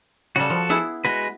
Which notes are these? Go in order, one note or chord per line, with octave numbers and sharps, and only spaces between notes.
C#3 G3 F#4 A4
F3
B3 E4 G#4
G#3 F#4 B4